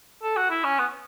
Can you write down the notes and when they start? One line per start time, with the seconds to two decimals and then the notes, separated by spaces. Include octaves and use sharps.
0.23 A4
0.37 F#4
0.50 E4
0.64 C#4
0.79 B3